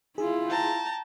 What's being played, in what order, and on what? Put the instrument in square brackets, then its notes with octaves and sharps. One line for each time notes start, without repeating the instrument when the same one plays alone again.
[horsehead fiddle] E4 F4 [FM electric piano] G#4
[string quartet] G5 A5 A#5